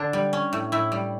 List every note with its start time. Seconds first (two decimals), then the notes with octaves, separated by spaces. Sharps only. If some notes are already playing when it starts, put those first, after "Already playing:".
Already playing: D3 D4
0.13 G3
0.33 C#4
0.53 A2
0.72 A2 E4
0.92 G3